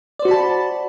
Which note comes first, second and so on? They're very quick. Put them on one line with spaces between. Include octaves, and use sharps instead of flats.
D5 C5 F#4 B5 A5